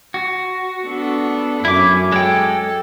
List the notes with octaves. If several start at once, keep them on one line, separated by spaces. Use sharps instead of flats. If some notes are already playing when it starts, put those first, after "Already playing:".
F#4
B3 D4 A4
F#2 C#4 E4 D6
G#3 A4 G5